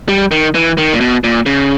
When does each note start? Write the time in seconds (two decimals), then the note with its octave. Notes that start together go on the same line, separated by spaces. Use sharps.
0.09 G3
0.31 D#3
0.55 E3
0.78 D#3
0.93 A#2
1.01 B2
1.24 A#2
1.46 C#3